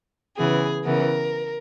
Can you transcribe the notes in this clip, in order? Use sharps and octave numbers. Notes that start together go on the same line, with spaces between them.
C#3 E3 B3 G#4
C#3 E3 B3 A#4